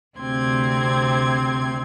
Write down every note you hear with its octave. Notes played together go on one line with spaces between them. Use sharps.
D2 C3 C4 C6 G#6